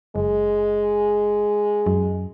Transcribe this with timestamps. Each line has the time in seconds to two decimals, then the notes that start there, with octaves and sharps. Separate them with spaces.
0.16 F#1 G#3
1.86 F#2